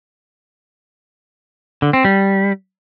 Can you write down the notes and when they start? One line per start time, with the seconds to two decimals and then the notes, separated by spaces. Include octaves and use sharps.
1.82 D3
1.93 C4
2.05 G3